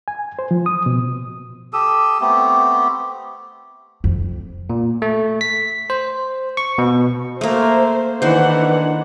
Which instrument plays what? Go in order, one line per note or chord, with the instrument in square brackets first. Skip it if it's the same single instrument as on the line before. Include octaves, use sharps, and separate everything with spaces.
[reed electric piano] G#5
C5
F3
D#6
B2
[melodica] G4 A4 D#6 E6
A3 B3 C4 G4
[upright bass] F2
[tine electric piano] A#2
A3
B6
C5
C#6
B2
[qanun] A3 A#3 [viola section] C5
[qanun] D#3 C5 [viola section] E3 D4 F#5